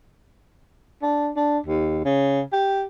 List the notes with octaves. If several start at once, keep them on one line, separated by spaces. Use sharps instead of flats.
D4
D4
D#2
C#3
G4